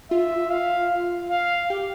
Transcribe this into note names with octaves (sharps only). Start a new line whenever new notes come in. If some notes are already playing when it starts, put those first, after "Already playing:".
F4 E5
F5
F5
G4